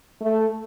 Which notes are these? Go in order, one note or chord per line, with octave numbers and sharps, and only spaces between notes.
A3